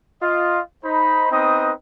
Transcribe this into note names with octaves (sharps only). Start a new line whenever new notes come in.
F4 D#5
D#4 C5 B5
B3 C4 D#4 B4 D#5 D#6